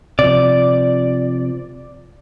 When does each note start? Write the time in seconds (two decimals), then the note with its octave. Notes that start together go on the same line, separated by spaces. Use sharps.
0.19 C3 F3 D5